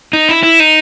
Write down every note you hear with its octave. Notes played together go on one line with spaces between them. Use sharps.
D#4
E4
E4
D#4